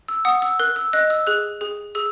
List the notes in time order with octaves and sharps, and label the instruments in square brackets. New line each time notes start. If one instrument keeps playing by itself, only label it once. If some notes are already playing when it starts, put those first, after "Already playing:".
[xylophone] E6
F#5 D#6
E6
A#4 F#6
E6
D#5 F#6
E6
G#4 F#6
G#4
G#4 E6